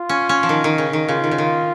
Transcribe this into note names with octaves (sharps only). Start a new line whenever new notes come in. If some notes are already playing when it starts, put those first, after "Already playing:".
Already playing: F4
C#4
C#4
F3
D#3
D#3
C#3
D#3
C#3 F4
D#3
C#3
D#3